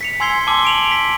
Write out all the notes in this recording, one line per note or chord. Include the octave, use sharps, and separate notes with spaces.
B6 C#7 F7
G#5 C6 E6 G#6 C7 G7
A5 C6 D6 E6 G7
D7 F7 F#7
B6 D7